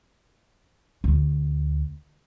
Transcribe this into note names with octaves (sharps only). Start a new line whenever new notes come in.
D2